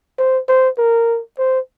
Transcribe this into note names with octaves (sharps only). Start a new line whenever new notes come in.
C5
C5
A#4
C5